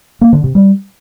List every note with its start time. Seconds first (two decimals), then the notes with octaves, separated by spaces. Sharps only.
0.21 A#3
0.33 D3
0.44 C3
0.55 G3